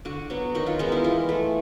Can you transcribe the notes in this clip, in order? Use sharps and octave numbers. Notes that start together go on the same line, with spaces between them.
D3 F#4
F#3 B3
D#3 F#4
F4
G#3 B3 D#4
E4
E3 F4
A3